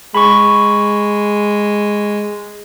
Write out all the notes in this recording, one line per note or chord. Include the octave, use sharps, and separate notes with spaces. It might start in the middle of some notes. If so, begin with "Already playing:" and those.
G#3 B5 C#6